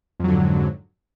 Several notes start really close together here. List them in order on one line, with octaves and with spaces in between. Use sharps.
F2 F#3 D3 G#2